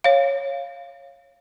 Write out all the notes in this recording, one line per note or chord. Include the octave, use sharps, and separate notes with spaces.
C#5 F5